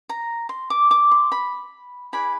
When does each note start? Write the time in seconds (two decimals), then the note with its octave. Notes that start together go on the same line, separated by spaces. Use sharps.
0.09 A#5
0.49 C6
0.70 D6
0.91 D6
1.11 C6
1.32 B5
2.13 E4 G#4 B4 D5 B5